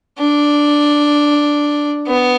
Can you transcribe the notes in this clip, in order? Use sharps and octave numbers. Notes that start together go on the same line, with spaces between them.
D4
B3